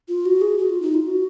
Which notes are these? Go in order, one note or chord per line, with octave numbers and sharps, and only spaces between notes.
F4
F#4
G#4
F#4
F4
D#4
F4
F#4